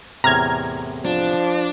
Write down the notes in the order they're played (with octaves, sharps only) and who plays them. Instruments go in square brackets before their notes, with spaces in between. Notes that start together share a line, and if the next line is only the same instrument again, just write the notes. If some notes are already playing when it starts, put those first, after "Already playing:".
[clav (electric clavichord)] E2 A2 C3 [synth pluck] A#5 F6 G#6
[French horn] F3 [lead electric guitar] D4